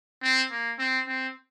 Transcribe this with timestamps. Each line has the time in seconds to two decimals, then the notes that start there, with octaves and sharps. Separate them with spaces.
0.23 C4
0.51 A#3
0.79 C4
1.07 C4